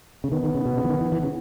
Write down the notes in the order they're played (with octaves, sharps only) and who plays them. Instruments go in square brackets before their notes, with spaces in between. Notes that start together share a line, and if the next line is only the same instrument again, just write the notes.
[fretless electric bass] C#3
[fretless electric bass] D#3 [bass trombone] B3
[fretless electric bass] D#3
C#3
B2
C#3
E3
D#3
E3
E3
C#3